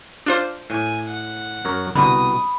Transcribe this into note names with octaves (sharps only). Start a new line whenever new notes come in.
D4 F4 C5
A2 G#5
F#5
F#2 A#4 C#5
C2 B2 D3 F#4 B5 D#6